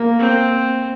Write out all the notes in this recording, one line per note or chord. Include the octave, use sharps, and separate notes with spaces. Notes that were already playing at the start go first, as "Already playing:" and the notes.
Already playing: A#3
C4